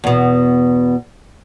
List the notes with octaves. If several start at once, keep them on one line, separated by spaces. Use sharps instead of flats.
E2 B2